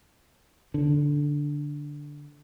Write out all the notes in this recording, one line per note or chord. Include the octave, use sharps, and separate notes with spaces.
D3